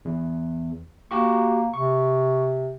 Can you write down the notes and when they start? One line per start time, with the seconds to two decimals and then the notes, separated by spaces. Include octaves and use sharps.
0.05 E2
1.11 A#3 F#4 G4 C#6
1.74 C3 C#6